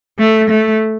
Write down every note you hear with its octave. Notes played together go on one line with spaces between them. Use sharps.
A3
A3